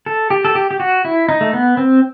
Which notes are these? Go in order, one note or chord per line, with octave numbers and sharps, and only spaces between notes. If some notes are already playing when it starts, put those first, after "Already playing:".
A4
G4
A4
G4
G4
F#4
E4
D#4
A3
B3
C4